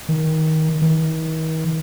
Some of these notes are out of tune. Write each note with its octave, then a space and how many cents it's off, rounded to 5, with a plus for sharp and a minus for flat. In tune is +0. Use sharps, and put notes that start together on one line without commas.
D#3 +20
D#3 +45